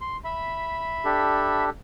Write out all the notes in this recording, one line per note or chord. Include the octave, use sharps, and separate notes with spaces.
C6
E5 B5
D4 G4 A4